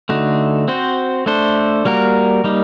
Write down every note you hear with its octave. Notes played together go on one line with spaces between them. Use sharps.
D3 A3 D#4 F#4
C4 F#4 C5
A3 D4 A4 C5
G3 A#3 F#4 A#4
G3 A#3 D#4